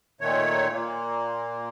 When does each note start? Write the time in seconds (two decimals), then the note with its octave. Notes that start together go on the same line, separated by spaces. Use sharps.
0.21 A#2 D#3 A3 C#5
0.72 A#2 A#3